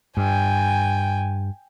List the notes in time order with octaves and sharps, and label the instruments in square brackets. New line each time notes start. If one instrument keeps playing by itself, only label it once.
[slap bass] G2 [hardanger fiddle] G5 G#5